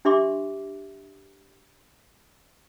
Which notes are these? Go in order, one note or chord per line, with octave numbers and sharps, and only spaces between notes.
D4 G4 E5 C6 D6